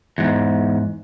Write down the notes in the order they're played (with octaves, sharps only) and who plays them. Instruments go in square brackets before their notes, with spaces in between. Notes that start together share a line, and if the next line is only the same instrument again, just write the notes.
[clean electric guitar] E2 G#2